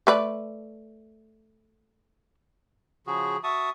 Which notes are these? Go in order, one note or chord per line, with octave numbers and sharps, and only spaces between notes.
A3 B4 D5
C#3 F3 F#4 G#4
F#4 E5 A5 C#6 D#6